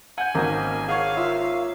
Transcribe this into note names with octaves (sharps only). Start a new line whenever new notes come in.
F#5 G#5 G6
G#1 A#3 C#4 F#4 D#5
G#4 C#5 F5 F#5
F4 E5